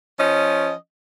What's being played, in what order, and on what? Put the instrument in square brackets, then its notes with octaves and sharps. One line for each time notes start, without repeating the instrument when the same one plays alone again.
[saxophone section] F3 C#4 D#5